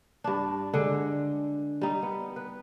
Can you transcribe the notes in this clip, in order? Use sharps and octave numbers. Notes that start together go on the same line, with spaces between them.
G2 D4
D3 G#3
G3 D#4
B3
B4